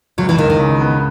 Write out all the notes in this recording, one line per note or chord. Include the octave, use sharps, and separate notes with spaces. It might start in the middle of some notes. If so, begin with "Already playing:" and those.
C#2 F#3
E3
C#2 D#3
D#3
C#3
B3